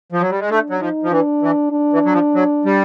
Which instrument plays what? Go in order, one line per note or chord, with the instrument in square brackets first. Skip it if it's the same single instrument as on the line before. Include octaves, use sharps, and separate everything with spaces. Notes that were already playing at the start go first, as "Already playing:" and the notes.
[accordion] F3
F#3
G3
G#3
[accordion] A3 [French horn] D4
[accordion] F#3
[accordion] F3 [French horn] D#4
[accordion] F3
[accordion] E3 [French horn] D4
[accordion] E3
[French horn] D4
[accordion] E3
F#3
F3
F#3
G3